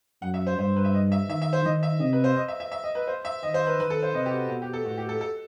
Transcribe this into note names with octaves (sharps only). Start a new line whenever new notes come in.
F#2 F#5
E5
C5
G2 C5
B4
E5
D#5
E5
D#3 E5
E5
C5
D#3 D#5
E5
C3 D#5
B4
C5
D#5
E5
E5
E5
D#5
B4
C5
E5
D#3 D#5
C5
B4
D#3 B4
A4
C5
C3 D#5
G4
F#4
B2 F#4
G4
A4
A2 F#4
G4
A4
A4